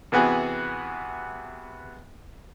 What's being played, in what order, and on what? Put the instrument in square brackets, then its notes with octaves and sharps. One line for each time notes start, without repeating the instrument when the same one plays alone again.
[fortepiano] C3 E3 B3 F#4 G#4